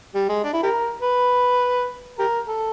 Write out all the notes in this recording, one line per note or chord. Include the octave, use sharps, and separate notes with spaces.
G3
G#3
D4
E4
G4 A#4
B4
G4 A#4
A4